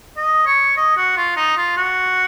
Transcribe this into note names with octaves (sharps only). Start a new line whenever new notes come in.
D#5
C#5
D#5
F#4
F4
D#4
F4
F#4